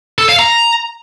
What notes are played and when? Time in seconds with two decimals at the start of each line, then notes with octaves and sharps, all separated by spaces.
0.18 A4
0.29 F5
0.39 A#5